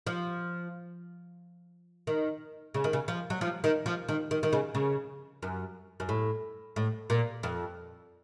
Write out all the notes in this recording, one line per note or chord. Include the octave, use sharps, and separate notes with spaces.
F3
D#3
C#3
D#3
C#3
F3
F#3
F3
D#3
F3
D#3
D#3
D#3
C#3
C#3
F#2
F#2
A2
A2
A#2
F2